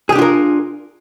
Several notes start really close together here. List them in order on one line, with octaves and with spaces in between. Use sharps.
G#4 G4 D4 F4 A#4